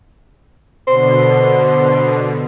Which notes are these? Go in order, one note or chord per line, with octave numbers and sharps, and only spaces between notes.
B2 D3 C5